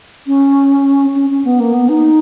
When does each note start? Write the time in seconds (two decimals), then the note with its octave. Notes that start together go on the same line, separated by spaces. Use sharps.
0.27 C#4
1.16 C#4
1.30 C#4
1.45 B3
1.60 A#3
1.74 B3
1.89 D#4